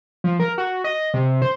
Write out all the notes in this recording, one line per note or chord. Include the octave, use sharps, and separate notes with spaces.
F3
A#4
F#4
D#5
C3
C5